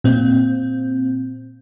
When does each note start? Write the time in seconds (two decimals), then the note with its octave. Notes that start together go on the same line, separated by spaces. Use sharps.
0.04 A#2 C4